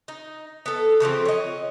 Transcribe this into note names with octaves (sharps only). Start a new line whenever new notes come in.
D#4
B3 A4
C#3 E3 F3 C4
C#5 D#5